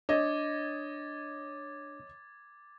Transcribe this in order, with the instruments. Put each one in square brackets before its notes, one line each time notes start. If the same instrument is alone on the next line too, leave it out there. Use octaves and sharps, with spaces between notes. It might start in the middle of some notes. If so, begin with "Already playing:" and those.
[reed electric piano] D4 [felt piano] C#5 D#5 [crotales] D6 G#6 A6